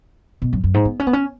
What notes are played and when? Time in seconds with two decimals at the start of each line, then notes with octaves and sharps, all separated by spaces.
0.42 B2
0.53 F#2
0.64 F#2
0.74 G#2
0.85 B3
1.00 C#4
1.07 B3
1.13 C#4